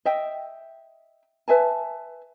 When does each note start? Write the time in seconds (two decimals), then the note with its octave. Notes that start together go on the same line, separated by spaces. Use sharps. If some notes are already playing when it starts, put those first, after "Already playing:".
0.05 D#5 E5 G5
1.48 B4 E5 G#5 A5